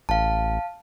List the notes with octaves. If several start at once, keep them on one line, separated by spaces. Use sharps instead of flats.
A1 F5 A5